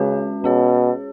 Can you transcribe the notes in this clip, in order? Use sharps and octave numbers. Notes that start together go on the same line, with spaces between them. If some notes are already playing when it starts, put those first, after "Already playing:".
Already playing: C#3 G#3 C#4 F#4 B4
B2 C#4 G#4 C#5